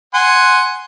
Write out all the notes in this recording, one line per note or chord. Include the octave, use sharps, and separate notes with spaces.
F#5 G#5 C6